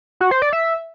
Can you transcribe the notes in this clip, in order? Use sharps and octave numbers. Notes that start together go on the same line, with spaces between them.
F#4
C5
D5
E5